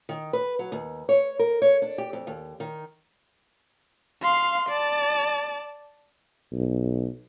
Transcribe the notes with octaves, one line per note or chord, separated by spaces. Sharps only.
D#3
B4
F#3
D#2
C#5
A#4
C#5
D4
G4
F2
D#2
D#3
F5 C6
D5 A5
B1